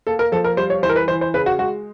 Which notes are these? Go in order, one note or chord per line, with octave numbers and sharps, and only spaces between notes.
A#3 A4
A#4
F3 A4
A#4
G3 C5
C#5
E3 C5
A#4
B4
E3 C5
C5
C#3 B4
F#4
G#3 F#4